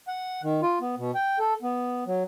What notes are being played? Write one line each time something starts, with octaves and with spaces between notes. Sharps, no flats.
F#5
D#3
F4
B3
B2
G5
A4
B3
F#3